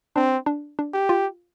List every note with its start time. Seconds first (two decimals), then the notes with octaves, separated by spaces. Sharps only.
0.16 C4 D4
0.46 D4
0.79 D4
0.94 G4
1.09 F4